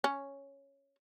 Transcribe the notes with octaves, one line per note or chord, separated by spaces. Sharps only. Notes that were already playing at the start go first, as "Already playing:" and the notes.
C#4